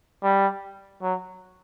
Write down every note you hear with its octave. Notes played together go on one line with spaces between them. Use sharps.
G3
F#3